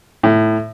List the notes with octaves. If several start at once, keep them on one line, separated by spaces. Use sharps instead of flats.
A2